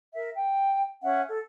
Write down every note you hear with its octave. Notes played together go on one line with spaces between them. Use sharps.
A#4 E5
G5
C#4 E5 F#5
A4